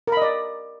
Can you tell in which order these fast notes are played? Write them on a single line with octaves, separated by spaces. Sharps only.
A#4 B5 D#5 D5